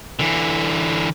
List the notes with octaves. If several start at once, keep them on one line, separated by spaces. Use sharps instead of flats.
D3 E3